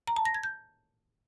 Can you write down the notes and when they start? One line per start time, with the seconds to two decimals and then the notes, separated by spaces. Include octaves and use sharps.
0.07 A#5
0.16 A5
0.25 A#6
0.34 G#6
0.43 G6